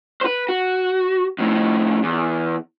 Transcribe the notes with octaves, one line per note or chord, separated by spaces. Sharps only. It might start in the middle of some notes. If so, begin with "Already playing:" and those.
B4 C5
F#4
F2 A2
E2